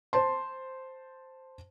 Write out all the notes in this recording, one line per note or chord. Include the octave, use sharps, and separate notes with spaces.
C5 A5 C6